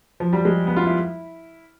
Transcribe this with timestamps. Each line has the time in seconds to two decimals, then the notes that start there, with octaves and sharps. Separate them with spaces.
0.20 F3
0.33 G3
0.45 G#3
0.67 B3
0.76 F4
0.86 E4